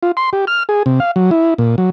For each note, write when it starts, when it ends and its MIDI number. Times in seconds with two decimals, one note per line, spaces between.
0.03 0.12 65
0.17 0.30 84
0.33 0.45 67
0.47 0.63 89
0.69 0.83 68
0.86 1.00 48
1.00 1.11 77
1.16 1.30 54
1.31 1.54 64
1.58 1.76 46
1.78 1.90 54